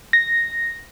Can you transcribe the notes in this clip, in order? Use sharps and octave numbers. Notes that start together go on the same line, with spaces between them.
A#6